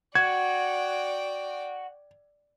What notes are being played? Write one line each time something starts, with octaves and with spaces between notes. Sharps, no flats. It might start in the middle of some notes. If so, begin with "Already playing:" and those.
F#4 D5 G5 G#6